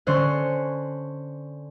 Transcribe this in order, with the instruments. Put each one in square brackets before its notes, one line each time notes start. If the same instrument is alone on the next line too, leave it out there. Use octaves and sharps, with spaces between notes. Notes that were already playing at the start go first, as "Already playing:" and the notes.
[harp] D3 C#4 C5 F#6 C#7